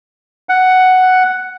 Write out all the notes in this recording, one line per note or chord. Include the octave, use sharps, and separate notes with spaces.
F#5